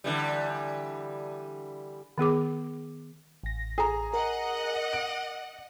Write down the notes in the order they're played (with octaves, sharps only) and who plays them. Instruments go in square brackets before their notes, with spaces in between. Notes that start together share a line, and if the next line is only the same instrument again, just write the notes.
[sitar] D3 E3 G3
[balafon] D#3 B3 G#4 D6
[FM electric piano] A1 A#6
[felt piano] G#4 A#5
[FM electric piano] A#4 [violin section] D#5 F#5
[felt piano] D7